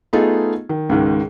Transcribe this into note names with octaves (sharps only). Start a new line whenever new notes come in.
A3 B3 D#4 F4 G#4 A4
D#3
C#2 G#2 D#3